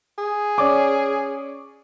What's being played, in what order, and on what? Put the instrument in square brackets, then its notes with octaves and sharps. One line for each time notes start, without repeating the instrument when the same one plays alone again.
[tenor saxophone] G#4
[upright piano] C#4 D5 D6